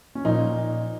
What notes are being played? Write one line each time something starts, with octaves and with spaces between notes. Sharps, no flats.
C#4
A#2 F3 D#4